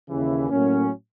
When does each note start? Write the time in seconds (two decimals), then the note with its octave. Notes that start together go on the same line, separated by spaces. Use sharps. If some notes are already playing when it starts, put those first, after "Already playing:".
0.10 D#2 C#3 E3
0.50 A2 F#3 A#3 C#4